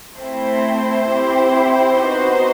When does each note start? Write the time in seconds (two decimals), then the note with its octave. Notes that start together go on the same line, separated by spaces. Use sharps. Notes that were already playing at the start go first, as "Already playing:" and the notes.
0.17 A3 C4 E4 C5
1.09 C4 E4 G4
2.02 B3 D#4 F#4